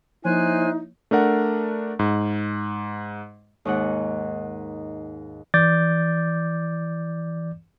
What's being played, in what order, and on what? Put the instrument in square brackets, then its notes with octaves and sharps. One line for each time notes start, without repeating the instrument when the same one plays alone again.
[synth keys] F3 A#3 C#5 [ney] D#4 [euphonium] E4 [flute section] C5 G#5 F#6
[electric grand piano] A3 D4 A#4 F#5
G#2
[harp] D#2 G#2 F#5
[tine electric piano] E3 D5 D6 G6 A6